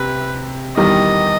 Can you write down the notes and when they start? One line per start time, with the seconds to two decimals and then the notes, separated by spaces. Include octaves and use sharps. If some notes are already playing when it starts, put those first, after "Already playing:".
Already playing: C3 C4 B4
0.77 E2 D#3 G3 D#4 D#5